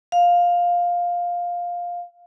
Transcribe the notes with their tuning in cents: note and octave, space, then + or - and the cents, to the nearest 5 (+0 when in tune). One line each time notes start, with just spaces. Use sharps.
F5 +10